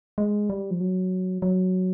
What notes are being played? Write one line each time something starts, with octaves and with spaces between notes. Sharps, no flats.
G#3
G3
F3
F#3
F#3